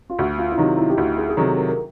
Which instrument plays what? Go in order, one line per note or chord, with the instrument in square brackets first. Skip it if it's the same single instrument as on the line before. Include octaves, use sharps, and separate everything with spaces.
[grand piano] F4
[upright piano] D2 [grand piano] F#4
[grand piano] F4
E4
[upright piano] C3 D#3 F#3 [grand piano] D#4
[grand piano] E4
G4
[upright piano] D2 [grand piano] F#4
[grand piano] G#4
G#4
[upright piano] C3 D#3 F#3 [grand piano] A4
[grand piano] A#4
A#4